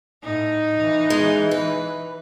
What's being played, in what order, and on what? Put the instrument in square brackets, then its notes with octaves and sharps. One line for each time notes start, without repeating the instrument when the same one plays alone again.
[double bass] A2 [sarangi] D#4
[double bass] E3
[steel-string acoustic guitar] G#3
B4